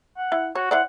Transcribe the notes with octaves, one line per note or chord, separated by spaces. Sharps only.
F#5
E4
F#4 C#5
E4 C5 D5 F#5